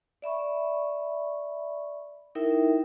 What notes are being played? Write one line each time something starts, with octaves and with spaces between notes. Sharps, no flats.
D5 E5 B5 C#6
D#4 E4 A#4 E5 G5